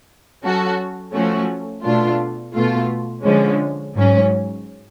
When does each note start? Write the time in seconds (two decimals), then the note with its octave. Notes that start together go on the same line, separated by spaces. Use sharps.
0.43 F#3 C#4 F#4 A4
1.13 F3 A3 C#4 F#4
1.84 B2 A3 D4 F4
2.54 B2 A3 F4
3.24 D3 F3 G#3 C#4
3.95 G#2 F#3 C#4